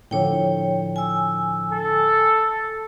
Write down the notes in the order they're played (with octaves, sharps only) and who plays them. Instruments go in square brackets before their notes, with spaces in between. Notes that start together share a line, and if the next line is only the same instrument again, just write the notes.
[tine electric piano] A2 D3 F3 [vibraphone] C#5 G5
[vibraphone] G#5 E6
[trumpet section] A4